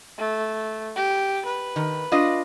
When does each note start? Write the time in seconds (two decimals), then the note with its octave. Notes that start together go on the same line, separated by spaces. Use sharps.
0.18 A3
0.96 G4
1.45 B4
1.76 D#3
2.12 D4 F4 D#5